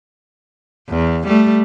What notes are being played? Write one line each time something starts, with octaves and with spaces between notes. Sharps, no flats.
E2
G3 A3